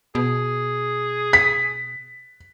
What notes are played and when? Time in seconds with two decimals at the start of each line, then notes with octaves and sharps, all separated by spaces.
0.15 B2 G#4
1.33 B6